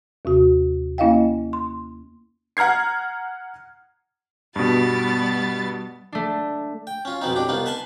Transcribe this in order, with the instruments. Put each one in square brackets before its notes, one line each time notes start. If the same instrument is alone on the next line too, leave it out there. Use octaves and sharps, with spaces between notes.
[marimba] D#2 C3 F#4
A#3 C#4 E4 D#5 F5 G5
C6
[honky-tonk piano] F#5 A#5 F6 G#6 C7
[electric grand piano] G2 B2 [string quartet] G3 B3 A6
[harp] A3 D4
[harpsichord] G5
C#4 F4
F2 B2 B3 C4 D#4
A2 D4 G4
C2 B3 D#4 F4
B4 G#5 A5 C6